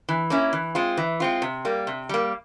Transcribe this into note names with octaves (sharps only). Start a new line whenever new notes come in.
E3
A#3 C#4 E4
E3
G#3 C4 F4
E3
G#3 C4 F4
C3
G3 A#3
C3
G3 A#3